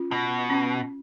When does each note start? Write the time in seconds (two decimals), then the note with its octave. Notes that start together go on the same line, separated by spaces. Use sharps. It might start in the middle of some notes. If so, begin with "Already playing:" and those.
Already playing: C#4 F4
0.11 B2
0.50 C#4